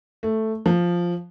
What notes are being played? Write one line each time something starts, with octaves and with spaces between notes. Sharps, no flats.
A3
F3